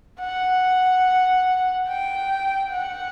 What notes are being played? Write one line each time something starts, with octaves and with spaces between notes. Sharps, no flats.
F#5
G5
F#5